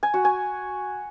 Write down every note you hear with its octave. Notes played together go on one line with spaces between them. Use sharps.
G#5
F#4
G#5